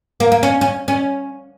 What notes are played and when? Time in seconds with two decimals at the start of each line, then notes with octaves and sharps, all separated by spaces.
0.20 A#3
0.32 A#3
0.43 C#4
0.61 C#4
0.88 C#4